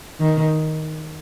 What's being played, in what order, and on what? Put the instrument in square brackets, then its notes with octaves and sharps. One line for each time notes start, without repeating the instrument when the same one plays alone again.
[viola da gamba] D#3